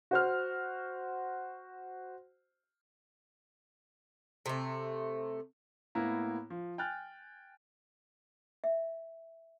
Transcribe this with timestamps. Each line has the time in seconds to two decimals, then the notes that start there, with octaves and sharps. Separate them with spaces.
0.11 F#4 C5 F6
4.46 C3 A3
5.95 A2 A#3 B3 E4 A#5
6.50 F3
6.78 G5 G#5 F6 F#6 A6
8.64 E5